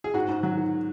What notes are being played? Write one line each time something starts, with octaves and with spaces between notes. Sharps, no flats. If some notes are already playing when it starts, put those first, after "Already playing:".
G#4
G#2 F#4
G#2
F#3
D#3